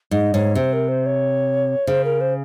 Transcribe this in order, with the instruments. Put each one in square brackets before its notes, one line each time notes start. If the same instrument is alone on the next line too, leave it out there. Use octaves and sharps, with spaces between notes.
[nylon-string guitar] G#2 [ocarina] D#5
[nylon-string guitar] G#2 [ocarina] C#5
[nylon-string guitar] C3 [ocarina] C5
[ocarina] A#4
C5
C#5
[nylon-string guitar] C#3 [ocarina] C5
[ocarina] A#4
C5